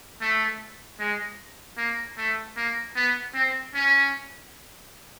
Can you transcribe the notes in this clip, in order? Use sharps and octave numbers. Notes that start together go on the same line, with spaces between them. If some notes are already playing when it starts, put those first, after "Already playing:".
A3
G#3
A#3
A3
A#3
B3
C4
C#4